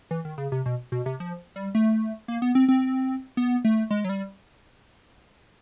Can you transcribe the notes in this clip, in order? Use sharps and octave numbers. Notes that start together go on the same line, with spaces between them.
E3
D#3
C#3
C3
B2
B2
C3
F3
G3
A3
A#3
B3
C4
C4
B3
A3
G#3
F#3
G3